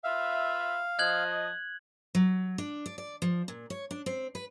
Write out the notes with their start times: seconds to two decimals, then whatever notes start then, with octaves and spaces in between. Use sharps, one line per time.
0.04 F4 B4 E5 F5
0.99 F3 D#5 F#6 G#6 F#7
2.15 F#3
2.58 D4
2.86 D5
2.98 D5
3.22 F3
3.48 A#2
3.70 C#5
3.91 D4
4.06 C4
4.35 B4